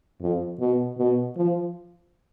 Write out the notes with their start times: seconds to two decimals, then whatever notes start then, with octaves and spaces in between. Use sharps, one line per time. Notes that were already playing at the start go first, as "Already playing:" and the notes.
0.21 F2
0.60 B2
0.98 B2
1.37 F3